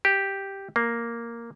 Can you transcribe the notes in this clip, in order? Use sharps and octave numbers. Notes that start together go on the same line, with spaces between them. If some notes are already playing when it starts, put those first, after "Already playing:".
G4
A#3